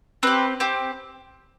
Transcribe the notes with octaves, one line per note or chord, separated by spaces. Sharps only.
C4 G4 B4
C4 G4